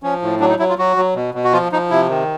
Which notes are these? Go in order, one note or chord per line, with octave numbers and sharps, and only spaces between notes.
F3 C#4
A2
F#3 D4
D#4
F#3 E4
F4
F#3 F#4
F#3
B2
B2
F#4
F3 F4
F3 D#4
C3 E4
D#3